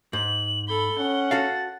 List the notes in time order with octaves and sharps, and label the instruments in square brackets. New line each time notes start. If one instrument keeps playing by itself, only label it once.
[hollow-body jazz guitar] G#2 [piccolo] F#7
[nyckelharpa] A4 B5 [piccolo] G7
[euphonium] C#4 [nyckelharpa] F#5
[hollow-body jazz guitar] F#4 A4 F5 [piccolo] A6